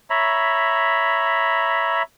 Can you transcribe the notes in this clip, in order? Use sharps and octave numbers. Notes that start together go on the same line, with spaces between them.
C#5 E5 A#5 B5